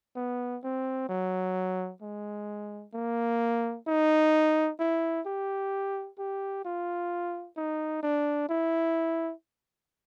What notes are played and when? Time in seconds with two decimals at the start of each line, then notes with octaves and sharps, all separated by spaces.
0.16 B3
0.63 C4
1.09 F#3
2.02 G#3
2.94 A#3
3.87 D#4
4.79 E4
5.26 G4
6.18 G4
6.65 F4
7.57 D#4
8.03 D4
8.49 E4